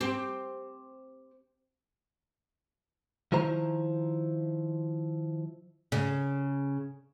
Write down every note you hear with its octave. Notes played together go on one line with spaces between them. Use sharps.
C4 G4
D#3 F3 E4 C5 A#5
C#3